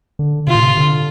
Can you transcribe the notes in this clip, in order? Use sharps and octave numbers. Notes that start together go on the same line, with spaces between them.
D3
C3 F4
A2
C3
D3